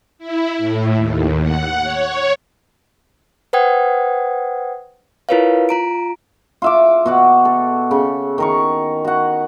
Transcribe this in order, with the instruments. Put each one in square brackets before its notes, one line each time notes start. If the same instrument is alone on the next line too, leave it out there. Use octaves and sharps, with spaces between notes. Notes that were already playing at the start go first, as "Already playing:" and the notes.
[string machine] E4
A2
D#2
F#5
C#5
[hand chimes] B4 C5 F#5 G5 D#6 G#6
E4 F4 A#4 B4 C#5 F5
F4 A#5 D7
[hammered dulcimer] F4 E5 D6
B2 F#4 F#5
A4
C#3
D#3 A#4 C#6
F#4 F#5